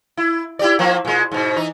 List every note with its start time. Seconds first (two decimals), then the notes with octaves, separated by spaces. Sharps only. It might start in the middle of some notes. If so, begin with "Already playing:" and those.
0.17 E4
0.59 E4 G4 D5
0.79 F3 A#3 C4
1.05 A#2 G#3
1.32 G#2 B2
1.56 E3 D#4